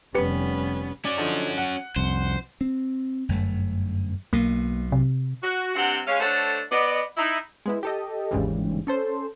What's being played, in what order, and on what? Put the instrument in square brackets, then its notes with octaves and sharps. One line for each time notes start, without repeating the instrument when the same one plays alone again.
[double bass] F1 G3 [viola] B3 C#4 [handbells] G4 B4 C#7
[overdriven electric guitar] C#4 F#4 [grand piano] D5
[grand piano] D3 F3 D#4
F#5
[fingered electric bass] C2 F2 [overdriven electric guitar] C5
[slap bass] C4
G1 F#2 A3
[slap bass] B1 B2 [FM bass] A#3
[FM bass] C3
[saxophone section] F#4
G2 C3 C4 G4 F#5
G#3 C#4 F5
A3 D4 A4 C5 C#5 F#5
B3 D5 D#5
D#4 E4
[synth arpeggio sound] G#3 B3 E4
G4 A4 D#5
G1 D#2 G#2 C#3 E3 G3
C#4 A4 C5